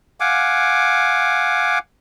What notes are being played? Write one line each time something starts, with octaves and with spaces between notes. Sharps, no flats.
F5 F#5 G#5 D6